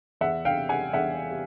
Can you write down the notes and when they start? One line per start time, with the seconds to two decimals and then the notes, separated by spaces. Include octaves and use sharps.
0.21 E2 E5 F#5
0.45 F5 G5
0.57 C3
0.69 F#5 G#5
0.93 E2 E5 F#5
1.30 C3